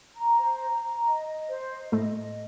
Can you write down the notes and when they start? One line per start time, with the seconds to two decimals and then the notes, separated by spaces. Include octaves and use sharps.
0.15 A#5
0.37 C5
0.59 A#5
0.81 A#5
1.03 D#5
1.26 D#5
1.48 C5
1.71 D#5
1.92 A2 A3 D#5
2.15 D#5